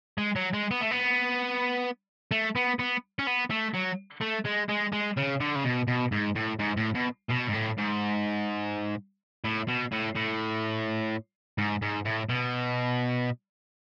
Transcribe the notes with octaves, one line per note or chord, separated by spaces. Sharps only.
G#3
F#3
G#3
B3
A3
B3
A3
B3
B3
C#4
B3
A3
F#3
A3
G#3
G#3
G#3
C#3
D3
C#3
B2
B2
G#2
A2
G#2
A2
B2
B2
G#2
A2
G#2
A2
B2
A2
A2
G#2
G#2
A2
B2